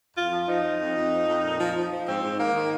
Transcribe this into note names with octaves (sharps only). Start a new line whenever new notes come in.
F2 F4
F3
F3 D#4
F3
F2
F2
F3
F2
A#2
F3
F3
F3
G#2 C4
G#2
D#3 A#3
D#3